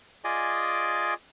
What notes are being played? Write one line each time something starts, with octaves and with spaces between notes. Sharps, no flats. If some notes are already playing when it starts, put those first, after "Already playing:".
F4 G#4 D5 D#5 G#5 D6